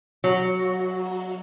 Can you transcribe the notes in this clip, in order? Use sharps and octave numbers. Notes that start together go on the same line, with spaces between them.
F#3